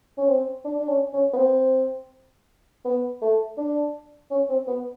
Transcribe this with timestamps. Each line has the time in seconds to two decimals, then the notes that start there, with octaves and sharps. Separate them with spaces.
0.18 C#4
0.28 C4
0.64 D4
0.79 D4
0.88 C#4
1.13 C#4
1.33 B3
1.37 C4
2.85 B3
3.22 A3
3.57 D4
4.31 C#4
4.49 C4
4.67 B3